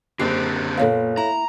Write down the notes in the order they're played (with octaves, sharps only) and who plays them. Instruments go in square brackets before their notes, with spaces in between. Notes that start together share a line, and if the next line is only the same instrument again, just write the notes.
[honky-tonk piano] F#1 F#6 C7 [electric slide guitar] D3 C4 [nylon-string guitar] G4
[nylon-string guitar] A#2 B3 [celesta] A4 C#5 F5
[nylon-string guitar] E4 [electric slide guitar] A#5